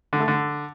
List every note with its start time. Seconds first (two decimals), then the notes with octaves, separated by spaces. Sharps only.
0.13 D3
0.20 A3
0.28 D3